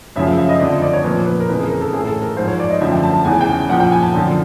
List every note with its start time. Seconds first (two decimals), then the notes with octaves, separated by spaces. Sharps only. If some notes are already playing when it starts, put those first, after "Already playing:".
0.16 F#2 C#3 F3 E5
0.27 F5
0.38 E5
0.49 D#5
0.60 F2 D3 F3 D5
0.71 D#5
0.82 D5
0.93 C#5
1.04 A#2 F3 B4
1.27 B4
1.40 A#4
1.48 F2 C#3 E3 B4
1.60 G#4
1.70 A#4
1.81 A4
1.93 A2 E3 G#4
2.07 A4
2.22 A#4
2.37 G#2 F3 C5
2.48 C#5
2.60 D5
2.70 D#5
2.81 F#2 D3 F3 E5
2.92 G5
3.03 A5
3.14 A5
3.25 E2 C#3 E3 G#5
3.41 G5
3.69 A#2 F3 F#5
3.80 G5
3.92 G#5
4.03 A5
4.14 F#2 D3 F3